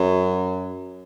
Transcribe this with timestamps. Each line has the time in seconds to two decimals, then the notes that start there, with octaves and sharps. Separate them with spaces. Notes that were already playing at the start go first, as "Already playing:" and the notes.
Already playing: F#2